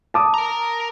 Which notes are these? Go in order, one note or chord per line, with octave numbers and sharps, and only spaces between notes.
A5 D6 D#6
A#4 A#5